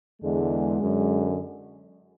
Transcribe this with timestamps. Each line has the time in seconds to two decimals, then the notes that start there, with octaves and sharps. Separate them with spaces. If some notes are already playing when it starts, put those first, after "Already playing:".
0.21 E2 D3 G#3
0.81 F#2 D3